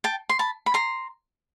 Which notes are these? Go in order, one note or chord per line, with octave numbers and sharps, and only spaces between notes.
G5 A5
C6
A5 B5
B5
A#5 C6